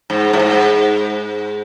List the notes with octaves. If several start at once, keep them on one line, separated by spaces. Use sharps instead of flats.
G#2
A2
G#2